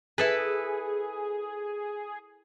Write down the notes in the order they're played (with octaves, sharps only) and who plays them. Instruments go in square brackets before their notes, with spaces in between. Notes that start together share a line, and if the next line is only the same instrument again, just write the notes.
[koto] E4 A4 B4 [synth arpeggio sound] G#4